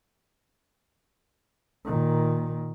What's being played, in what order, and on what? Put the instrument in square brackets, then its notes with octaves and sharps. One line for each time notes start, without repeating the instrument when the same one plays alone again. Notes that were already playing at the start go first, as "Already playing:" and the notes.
[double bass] A#2 D#3